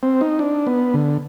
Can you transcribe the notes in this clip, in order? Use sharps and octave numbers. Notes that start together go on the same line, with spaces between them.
C4
D#4
D4
B3
D3